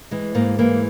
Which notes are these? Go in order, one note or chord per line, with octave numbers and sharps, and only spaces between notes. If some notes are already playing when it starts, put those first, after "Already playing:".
E3 G#3
G#2 A#3
E3 A#3